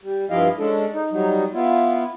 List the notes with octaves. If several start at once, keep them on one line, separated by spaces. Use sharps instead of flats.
G3
G2 F3 E4 G4 D#5 F5
G#3 C#4 D4 A4
D#4
F#3 G3 D#4
B3 E4 F4